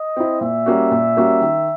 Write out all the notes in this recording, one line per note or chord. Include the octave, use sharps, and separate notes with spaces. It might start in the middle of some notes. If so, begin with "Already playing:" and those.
Already playing: D#5
C4 E4
A#2 E5
G3 A#3 C#4 F#4
A#2
G3 A#3 C#4 F#4
D#3